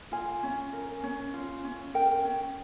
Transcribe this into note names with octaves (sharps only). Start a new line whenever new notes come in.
F4 G#5
C#4
A#4
C#4
F4
C#4
A#4 G5
C#4